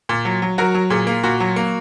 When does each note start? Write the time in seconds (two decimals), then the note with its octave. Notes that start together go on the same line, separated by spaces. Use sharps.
0.09 A#2
0.25 F#3
0.42 F#3
0.58 F#3 F#4 A#4
0.74 F#3
0.90 A#2 G#4
1.07 A#3
1.23 A#2 F#4
1.40 F#3
1.56 A#3